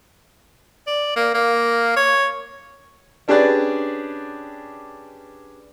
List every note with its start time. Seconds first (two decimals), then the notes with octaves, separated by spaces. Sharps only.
0.87 D5
1.16 A#3
1.34 A#3
1.96 C#5
3.28 C#4 D4 G4 G#4 B4 D5